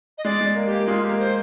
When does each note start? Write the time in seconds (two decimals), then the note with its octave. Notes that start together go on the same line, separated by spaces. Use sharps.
0.18 D#5
0.25 G#3 D5
0.41 G#3
0.55 A#3
0.66 G4
0.72 A#3
0.87 G#3 F4
1.03 G4
1.09 A#3
1.19 C5